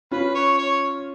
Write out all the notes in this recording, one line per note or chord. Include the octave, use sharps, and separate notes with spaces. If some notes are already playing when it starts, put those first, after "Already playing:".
C#4 F4 B4
C#5
C#5